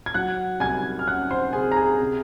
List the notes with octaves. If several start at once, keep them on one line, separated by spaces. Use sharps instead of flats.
G#6
F#3 F#5 F#6
C2 G#5 G#6
F6
C#4 F#5 F#6
C5 C6
C3 G#4 G#5
A#5
G#4 G#5
C3